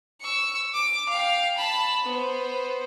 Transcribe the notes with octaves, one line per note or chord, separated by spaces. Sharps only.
C#6 E6
D6
F5 G5
A5 B5
B3 C5